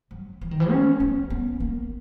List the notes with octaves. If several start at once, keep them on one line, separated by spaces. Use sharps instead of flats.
F#3
E3
D#3
E3
C#4
B3
B3
A#3